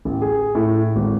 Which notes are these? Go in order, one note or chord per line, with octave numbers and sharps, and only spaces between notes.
A1
G#4
A2
G#1